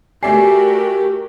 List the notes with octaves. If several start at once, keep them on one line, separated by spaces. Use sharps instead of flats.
A3 F#4 G4 A#4 D5 G#5 C7